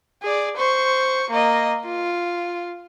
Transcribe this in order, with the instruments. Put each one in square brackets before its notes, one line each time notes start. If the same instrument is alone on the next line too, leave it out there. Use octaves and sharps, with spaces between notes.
[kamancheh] G#4 D5
C5 C#6
A#3 D#5
F4